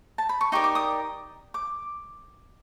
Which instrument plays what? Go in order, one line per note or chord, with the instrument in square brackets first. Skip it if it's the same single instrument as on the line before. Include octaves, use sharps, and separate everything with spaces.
[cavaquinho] A5
B5
C#6
D#4 G4 A#4 D5 C#6
D6
D#6
D6